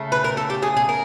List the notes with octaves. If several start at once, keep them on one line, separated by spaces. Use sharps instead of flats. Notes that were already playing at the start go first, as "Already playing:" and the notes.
Already playing: C#3 A3
B4
A#4
A4
G4
G#4
G#4
A#4